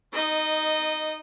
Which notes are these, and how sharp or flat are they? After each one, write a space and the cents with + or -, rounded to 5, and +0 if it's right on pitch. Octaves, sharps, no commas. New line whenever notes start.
D#4 +0 D#5 -15